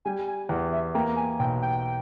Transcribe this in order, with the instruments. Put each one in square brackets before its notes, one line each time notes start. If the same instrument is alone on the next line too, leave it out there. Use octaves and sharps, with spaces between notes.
[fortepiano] G3 [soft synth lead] G#5
[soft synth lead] G#5
[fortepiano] E2 [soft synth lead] G5
[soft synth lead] E5
[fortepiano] A#3 [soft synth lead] G5
[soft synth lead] G#5
[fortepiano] B1 [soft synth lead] G5
[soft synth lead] G5